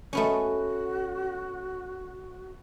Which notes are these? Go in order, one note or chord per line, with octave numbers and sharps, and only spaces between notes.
A3 B3 C#4 F#4